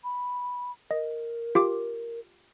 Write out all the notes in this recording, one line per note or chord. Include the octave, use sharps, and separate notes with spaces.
B5
A#4 D#5
F4 G4 D6